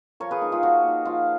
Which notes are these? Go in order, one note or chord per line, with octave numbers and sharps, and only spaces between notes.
F3 A#4 C#5
G#4 B4
A#3 D#4
F4 G#4
F3 F#4
A#3 D#4
F3 F4